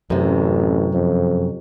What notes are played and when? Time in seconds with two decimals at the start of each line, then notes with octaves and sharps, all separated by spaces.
0.10 A1 F#2 C3
0.94 F2